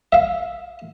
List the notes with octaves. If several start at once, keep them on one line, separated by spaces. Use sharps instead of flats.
E5 F5